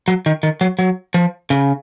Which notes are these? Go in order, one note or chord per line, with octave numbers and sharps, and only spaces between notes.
F#3
D#3
D#3
F#3
F#3
F3
C#3